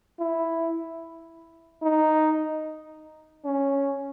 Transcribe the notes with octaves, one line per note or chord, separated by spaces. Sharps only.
E4
D#4
C#4